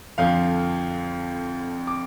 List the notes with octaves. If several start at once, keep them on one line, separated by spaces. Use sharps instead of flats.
F2 D3 F3 F5
D6